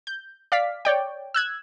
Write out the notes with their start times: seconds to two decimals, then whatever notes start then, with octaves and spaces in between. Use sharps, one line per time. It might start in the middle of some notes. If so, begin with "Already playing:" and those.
0.07 G6
0.52 D5 F5 B6
0.85 C#5 D5 G5
1.34 E6 F#6 G#6